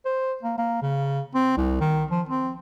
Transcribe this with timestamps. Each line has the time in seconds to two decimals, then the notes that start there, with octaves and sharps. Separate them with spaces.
0.06 C5
0.43 A#3
0.58 A#3
0.82 C#3
1.35 C4
1.57 C2
1.81 D#3
2.11 F3
2.29 C4